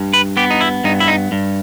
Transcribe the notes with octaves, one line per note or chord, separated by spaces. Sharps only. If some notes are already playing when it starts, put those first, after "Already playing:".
Already playing: G2
B4
B3 G4
D#4
E4
G2 D#4
E4
D#4
G2